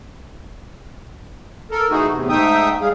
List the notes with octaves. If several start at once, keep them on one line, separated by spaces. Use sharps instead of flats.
A4 A#4
E3 A3 D#4 F#4 G#4
E2 A2 C3
G#2 A3 D#4 E5 G5 D#6
G3 G#3 G#4 F5